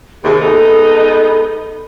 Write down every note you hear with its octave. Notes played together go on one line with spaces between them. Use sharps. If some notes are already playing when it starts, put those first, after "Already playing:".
D#2 C3 G#4
G#3 B3 D#4 A4